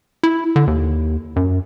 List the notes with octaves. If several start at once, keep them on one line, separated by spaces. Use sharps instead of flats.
E4
D3
D#2
F#2